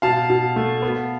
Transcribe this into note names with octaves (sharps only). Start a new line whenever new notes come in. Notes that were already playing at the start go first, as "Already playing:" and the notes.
B2 F5 A5
B2
A3
B3